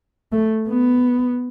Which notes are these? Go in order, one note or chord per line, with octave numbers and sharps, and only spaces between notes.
A3
B3